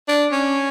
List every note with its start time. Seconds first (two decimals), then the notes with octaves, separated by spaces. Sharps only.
0.08 D4
0.32 C#4